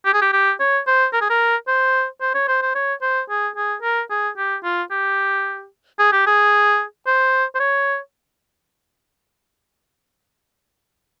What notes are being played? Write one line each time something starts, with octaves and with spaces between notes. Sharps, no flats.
G4
G#4
G4
G4
C#5
C5
A#4
G#4
A#4
C5
C5
C#5
C5
C5
C#5
C5
G#4
G#4
A#4
G#4
G4
F4
G4
G#4
G4
G#4
C5
C5
C#5